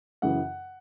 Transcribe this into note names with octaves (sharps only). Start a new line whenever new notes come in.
F#2 C#3 E3 F#5